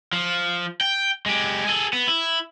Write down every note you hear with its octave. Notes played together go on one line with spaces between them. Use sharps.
F3
G5
G#3 G4
G#4 A4
B3
E4